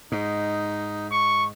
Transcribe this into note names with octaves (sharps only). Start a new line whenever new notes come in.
G#2 D#4
C#6